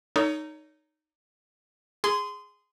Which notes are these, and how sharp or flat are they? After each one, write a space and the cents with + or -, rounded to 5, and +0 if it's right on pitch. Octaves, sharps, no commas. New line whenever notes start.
D#4 -10 A4 +35 C#5 +30
G#4 -10 C6 -25